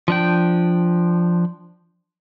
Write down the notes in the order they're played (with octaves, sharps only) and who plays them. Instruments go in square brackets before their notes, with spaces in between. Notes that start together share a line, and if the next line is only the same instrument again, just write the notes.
[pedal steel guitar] F3 D4 G5